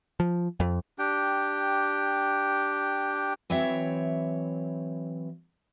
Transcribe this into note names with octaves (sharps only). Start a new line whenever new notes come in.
F3
F2
D4 G4 G5
E3 F#3 C4 C#5 E5